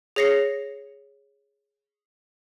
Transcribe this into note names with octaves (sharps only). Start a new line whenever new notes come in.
G#4 C#5 A#6 C7 C#7